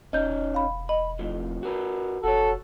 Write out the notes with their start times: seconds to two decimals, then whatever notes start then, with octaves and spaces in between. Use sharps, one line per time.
0.13 E1 C#4 D#4 D#5 G6
0.54 F5 B5
0.89 D#5 B5
1.19 F2 A2 F3
1.63 F#4 A#4 B4
2.23 F1 F#4 A4 C#5